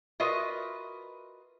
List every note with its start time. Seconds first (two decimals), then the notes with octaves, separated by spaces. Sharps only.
0.20 F4 F#4 A#4 B4 D#5 E5